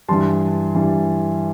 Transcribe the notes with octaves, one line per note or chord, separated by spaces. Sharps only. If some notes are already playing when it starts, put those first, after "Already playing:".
G2 E3 G3 A5 C6
G2 E3 G3